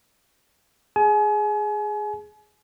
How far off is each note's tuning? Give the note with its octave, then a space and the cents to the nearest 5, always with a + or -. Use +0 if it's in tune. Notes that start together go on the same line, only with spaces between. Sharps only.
G#4 +0 G#5 +35